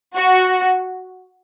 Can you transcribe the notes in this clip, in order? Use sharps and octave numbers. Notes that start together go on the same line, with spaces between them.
F#4